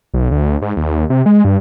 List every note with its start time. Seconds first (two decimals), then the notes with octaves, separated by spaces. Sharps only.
0.14 B1
0.31 D2
0.62 G#2
0.77 D#2
1.10 C3
1.26 G#3
1.45 G2